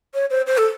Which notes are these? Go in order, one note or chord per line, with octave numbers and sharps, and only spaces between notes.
C#5
C5
C5
A4